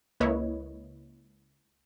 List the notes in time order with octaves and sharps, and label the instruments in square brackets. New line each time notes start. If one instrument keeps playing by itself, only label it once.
[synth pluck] C#2 A#3 E4 B4 C#5 D#5